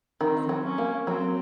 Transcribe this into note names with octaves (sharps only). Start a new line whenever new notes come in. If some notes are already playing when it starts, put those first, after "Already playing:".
D#3 C4
F#3
C#4
A#3
F#3 C4